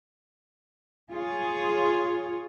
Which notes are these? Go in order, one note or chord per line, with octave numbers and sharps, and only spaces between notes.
F4 G#4 C#5